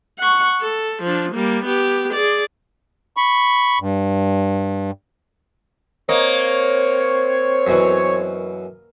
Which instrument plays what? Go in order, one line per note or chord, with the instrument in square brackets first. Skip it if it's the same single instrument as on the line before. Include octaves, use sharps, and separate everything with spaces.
[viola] F#5 C#6
A4
F3 D4
G3 A#3
B3 G4
G#4 D5
[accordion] B5 C#6
G2
[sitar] A#3 [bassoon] C4 [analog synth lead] C#5 [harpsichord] D#5
[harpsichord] F#2 B2 E3